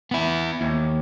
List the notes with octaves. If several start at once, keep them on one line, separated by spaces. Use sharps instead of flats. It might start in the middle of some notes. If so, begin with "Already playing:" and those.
B3 E4
D#2